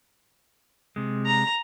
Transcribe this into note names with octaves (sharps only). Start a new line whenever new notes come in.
C3 G#3
A#5